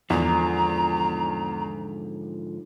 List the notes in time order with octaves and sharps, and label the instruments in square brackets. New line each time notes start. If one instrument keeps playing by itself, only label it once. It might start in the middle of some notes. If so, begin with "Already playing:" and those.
[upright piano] E2 [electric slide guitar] G#2 D3 F3 [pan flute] A#5